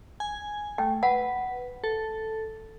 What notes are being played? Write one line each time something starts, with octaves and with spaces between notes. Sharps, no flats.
G#5
A3 G5
B4 F#5
A4